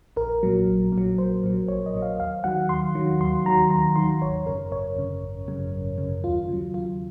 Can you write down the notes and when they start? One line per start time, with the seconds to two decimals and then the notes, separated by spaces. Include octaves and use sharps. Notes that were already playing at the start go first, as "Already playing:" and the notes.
0.16 A#1 A#4
0.43 A#2 F#3
0.67 A#1
0.92 A#2
0.98 F#3
1.18 A#1 C5
1.44 A#2 F#3
1.68 A#1 C#5
1.86 D#5
1.94 A#2 F#3
2.02 F5
2.19 D#2 F5
2.44 D#3 F#3 F#5
2.69 D#2 C6
2.95 D#3 F#3
3.20 D#2 C6
3.45 D#3 F#3 A#5
3.71 D#2 A#5
3.96 D#3 F#3 C6
4.22 G#1 C#5
4.46 F#2 C#3 A#4
4.72 G#1 C#5
4.97 F#2 C#3
5.23 G#1
5.48 F#2 C#3
5.73 G#1
5.98 F#2 C#3
6.24 D#2 F4
6.48 C#3 F#3
6.74 D#2 F4